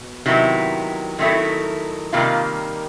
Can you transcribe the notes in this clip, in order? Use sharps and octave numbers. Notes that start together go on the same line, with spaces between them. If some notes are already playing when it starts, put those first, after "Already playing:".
Already playing: B2
C3 D#3 F#3 B3 E4
D#3 F#3 A3 C4 E4
C3 D#3 G3 A#3 F4